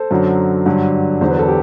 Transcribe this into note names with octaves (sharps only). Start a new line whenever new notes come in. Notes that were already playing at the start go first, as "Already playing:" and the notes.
Already playing: A4 C5
F#2 D3 F#3
G2 D3 F#3
E2 D3 F#3 C5
B4
A4
G4